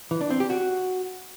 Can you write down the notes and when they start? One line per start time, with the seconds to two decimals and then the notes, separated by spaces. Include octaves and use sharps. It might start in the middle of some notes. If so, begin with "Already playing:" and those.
0.11 E3
0.21 D4
0.30 C4
0.40 G4
0.50 F#4